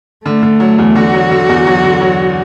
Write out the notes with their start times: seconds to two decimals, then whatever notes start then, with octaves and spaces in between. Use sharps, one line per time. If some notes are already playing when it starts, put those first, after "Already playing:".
0.25 D3 A3
0.43 D3
0.60 F#3
0.78 E2
0.95 D3 F#4
1.14 F#3
1.31 D3
1.49 E2
1.67 F#3
1.83 D3
2.01 F#3